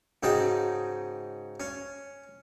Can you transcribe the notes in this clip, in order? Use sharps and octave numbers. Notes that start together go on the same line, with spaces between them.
G#2 C#3 D#4 F#4 G5 A5
C#4